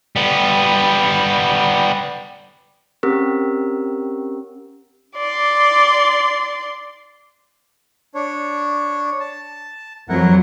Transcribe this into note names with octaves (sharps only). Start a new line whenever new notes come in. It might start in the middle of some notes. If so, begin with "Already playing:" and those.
G3 B3
C4 C#4 G4 A#4
D5 C6
D4 C#5
A5
F2 F#3 E4 A#4 F#5